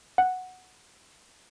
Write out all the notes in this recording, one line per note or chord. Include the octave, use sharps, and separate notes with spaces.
F#5